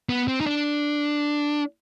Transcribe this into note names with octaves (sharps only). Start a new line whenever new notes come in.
B3
C4
D#4
D4